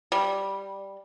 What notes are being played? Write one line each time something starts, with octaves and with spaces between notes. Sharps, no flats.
G3